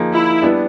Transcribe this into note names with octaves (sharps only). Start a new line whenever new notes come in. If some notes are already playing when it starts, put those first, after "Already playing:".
Already playing: F3 A#3 D#4 G#4
E4
G3 B3 D4